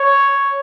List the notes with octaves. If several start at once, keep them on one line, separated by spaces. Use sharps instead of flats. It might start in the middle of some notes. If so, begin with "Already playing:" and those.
Already playing: C#5